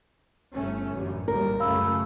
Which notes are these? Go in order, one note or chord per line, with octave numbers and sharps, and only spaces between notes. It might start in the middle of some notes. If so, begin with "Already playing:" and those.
G1 A3 C#4
A1 F#2 D3
A#1 D#2 G3 A#4
F#2 C#3 A3 F5 B5 E6